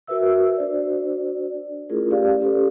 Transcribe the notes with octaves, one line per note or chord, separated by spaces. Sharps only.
F#4 A#4 B4 E5 E6
D4 F#4 C5 D5
A3 C#4 E4 F4 G#4 A#4
C#4 G4 B4 D5 F5
C#4 G4 A4 B4